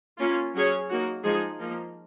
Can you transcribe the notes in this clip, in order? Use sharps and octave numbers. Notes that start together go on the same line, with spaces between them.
A#3 C#4 F4
F#3 C#4 G#4 C#5
A#3 D#4 F#4
F3 G#3 D#4 G#4
F3 A#3 D#4